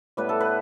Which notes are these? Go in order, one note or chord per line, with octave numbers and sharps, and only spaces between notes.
A2 G3 B3 B4
A4
B4